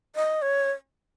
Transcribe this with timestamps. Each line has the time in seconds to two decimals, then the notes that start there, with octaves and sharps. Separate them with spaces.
0.16 D#5
0.42 C#5